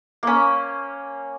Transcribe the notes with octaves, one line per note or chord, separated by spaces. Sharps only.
A#3 C#4